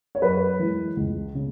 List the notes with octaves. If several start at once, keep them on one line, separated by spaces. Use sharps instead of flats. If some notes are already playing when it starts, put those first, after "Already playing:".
C#5
F#2 B4
E3 G#3
C#2
C#3